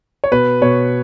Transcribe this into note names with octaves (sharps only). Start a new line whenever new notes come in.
C#5
B2 B4
B2 C#5